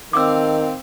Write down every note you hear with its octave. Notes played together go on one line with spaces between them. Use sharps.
D#3 C4 F5 D6 E6